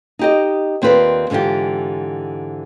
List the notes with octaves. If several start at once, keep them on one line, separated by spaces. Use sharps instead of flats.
D#4 G4 D#5
D#2 C4 F4 B4 D5
G#2 D3 E3 F4 G4